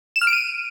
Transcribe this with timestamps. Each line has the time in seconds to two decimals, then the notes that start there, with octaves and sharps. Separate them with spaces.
0.16 E7
0.21 F6
0.27 D7
0.33 D#7